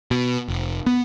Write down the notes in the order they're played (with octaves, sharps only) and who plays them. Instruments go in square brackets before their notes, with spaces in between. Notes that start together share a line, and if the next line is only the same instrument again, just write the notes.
[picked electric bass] B2
F1
B3